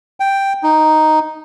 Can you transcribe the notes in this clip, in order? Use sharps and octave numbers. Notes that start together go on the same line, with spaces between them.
G5
D#4